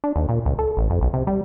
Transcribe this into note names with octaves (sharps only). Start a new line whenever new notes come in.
D4
D#2
A#2
C#2
A4
A1
F2
B1
C3
G3